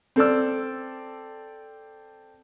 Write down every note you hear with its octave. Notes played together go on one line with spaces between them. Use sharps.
C4 A4 D5 E6